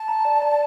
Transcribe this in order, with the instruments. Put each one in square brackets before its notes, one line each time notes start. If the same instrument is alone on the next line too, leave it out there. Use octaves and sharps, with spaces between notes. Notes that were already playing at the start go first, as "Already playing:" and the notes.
Already playing: [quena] A5
[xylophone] A#5
D5
D5